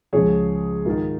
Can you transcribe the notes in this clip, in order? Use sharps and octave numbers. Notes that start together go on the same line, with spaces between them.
C#2 C#3 F3 G#4 C#5
G#2 D#3 F4 A#4